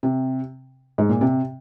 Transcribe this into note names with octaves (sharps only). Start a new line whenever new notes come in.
C3
G#2
A#2
C3